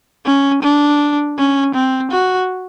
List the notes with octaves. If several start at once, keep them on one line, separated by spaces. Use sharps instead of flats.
C#4
D4
C#4
C4
F#4